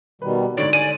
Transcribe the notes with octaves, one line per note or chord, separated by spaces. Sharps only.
B2 D#3 G3 B4
G#2 D3 C#5 D5
D5 G#5 D#7